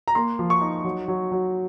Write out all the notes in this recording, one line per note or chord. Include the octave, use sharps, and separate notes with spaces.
A#5
A#3 C6
F3
C#6
D#4
F#3
F#3
F#3